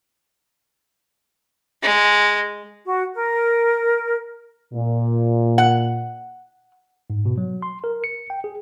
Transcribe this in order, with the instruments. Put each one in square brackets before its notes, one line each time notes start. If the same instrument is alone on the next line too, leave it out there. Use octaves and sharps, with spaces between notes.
[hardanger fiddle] G#3
[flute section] F#4
A#4
[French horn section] A#2
[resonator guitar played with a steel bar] F#5
[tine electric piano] G#2
B2
F#3
C6
A#4
C#7
G5
G#4